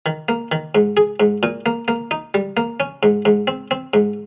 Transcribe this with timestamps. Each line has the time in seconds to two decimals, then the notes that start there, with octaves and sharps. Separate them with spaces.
0.06 D#3
0.29 A#3
0.52 D#3
0.75 G#2
0.97 G#4
1.20 G#2
1.43 A#2
1.66 A#3
1.88 A#3
2.11 D#4
2.34 G3
2.57 A#3
2.80 C#4
3.03 G#2
3.25 G#2
3.47 C4
3.71 C4
3.94 G#2